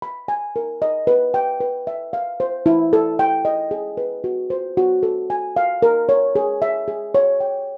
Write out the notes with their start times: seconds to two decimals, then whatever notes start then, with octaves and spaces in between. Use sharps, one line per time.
0.02 B5
0.28 G#5
0.56 A#4
0.82 D#5
1.07 B4
1.34 G5
1.60 B4
1.87 E5
2.13 F5
2.40 C5
2.66 E4
2.93 A4
3.19 G5
3.45 D#5
3.71 G#4
3.97 B4
4.24 F#4
4.50 C5
4.77 F#4
5.03 A4
5.30 G#5
5.57 F5
5.82 A#4
6.09 C#5
6.35 G#4
6.62 E5
6.88 G#4
7.15 C#5
7.40 G5